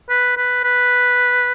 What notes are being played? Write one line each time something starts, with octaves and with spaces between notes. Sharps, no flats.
B4
B4
B4